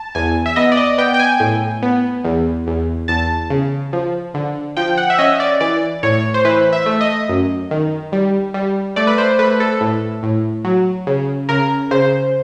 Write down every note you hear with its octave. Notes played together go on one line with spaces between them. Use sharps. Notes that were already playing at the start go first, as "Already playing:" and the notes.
Already playing: A5
E2 G#5
E5
B3 D#5
D5
D#5
B3 G5
G5
G#5
A2
B3
E2
E2
E2 A5
C#3
F3
D3
F3 G5
F#5
E5
C#4 D#5
D5
E3 D5
A2 C#5
C5
E3 B4
E5
A3
D#5
F#2
D#3
G3
G3
A3 D5
B4
C5
A3 B4
A4
A2
A2
F#3
C#3
C#3 A#4
C#3 C5